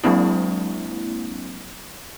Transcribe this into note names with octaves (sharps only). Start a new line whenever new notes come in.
F#3 G#3 A#3 C4 D4 E4